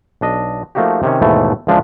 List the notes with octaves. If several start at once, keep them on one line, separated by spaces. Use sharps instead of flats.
B1 D4 D#5
F3 A3 A#3 D#4 F#4 G4
C3 D#3 C#4
D#2 G#2 B2 E3 A3
C#2 E3 F3 G#3 D4 E5